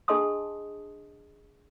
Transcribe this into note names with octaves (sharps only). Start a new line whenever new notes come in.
D4 G#4 D#5 A5 C6 D#6